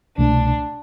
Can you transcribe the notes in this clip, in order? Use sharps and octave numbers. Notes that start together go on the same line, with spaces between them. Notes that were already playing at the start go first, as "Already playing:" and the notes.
C2 B2 A3 D4